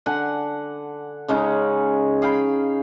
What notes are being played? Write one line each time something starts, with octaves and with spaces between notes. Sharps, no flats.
D3 F#5 G#5
C#3 G#3 C#4 D#4
G#4 F5 G5 B5